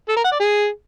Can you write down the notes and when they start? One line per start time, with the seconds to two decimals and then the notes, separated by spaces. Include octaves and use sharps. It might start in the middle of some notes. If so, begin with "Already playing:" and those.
0.08 A4
0.16 A#4
0.24 F#5
0.32 D5
0.40 G#4